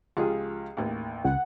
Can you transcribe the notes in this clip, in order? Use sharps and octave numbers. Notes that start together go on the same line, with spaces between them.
C#2 F3 F4 G4 G#4
A1 D#2
C#2 F#5